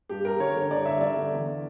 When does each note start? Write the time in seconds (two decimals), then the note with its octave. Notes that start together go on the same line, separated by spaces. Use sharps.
0.09 G2 G4
0.25 G2 A#4
0.40 D3 C#5
0.56 D3
0.70 G2 D5
0.85 G2 E5
1.01 D3 D5
1.16 D3
1.32 E2